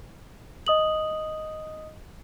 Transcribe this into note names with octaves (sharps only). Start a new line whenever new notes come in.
D#5 D#6 F#7